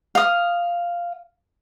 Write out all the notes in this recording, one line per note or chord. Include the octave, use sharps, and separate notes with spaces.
F5 D#6